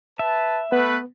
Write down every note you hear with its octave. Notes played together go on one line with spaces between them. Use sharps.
B4 E5 A5
A3 B3 B4